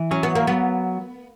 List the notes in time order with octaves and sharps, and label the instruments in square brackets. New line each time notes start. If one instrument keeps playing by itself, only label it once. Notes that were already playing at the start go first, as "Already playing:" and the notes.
Already playing: [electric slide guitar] E3
[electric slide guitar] F#3 [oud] C#4
[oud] B3
A#3
[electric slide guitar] F#3 [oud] B3